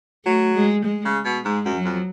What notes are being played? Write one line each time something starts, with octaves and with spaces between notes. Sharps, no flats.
F#3 A3
G#3
G#3
C#3
B2
G#2 G#3
F#2
F#3
F2